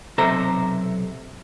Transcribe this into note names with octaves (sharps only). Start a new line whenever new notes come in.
B1 C3 A4 C5 E5 A#5